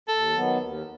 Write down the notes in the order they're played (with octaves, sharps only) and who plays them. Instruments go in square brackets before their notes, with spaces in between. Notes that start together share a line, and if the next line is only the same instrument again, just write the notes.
[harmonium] D#2 [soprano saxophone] A4
[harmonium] D#3 F#3 B3
D#2